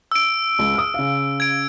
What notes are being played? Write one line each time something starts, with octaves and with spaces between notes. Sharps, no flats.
E6 D7
C#2
D#6 F6
C#3 F5
G#6 D7